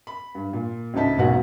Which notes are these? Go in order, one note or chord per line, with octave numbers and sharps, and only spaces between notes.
B5
G2
A#2
D2 A2 C#3 D#4 A5 B6
E1 B1 F#2 B3 F#4 F#5